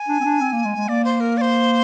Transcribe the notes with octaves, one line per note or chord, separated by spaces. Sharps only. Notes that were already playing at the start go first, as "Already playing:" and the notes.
Already playing: G#5
D4
C4
D4
C4
A#3
G#3
G#3
A#3 D5
C5
A#4
D5
C5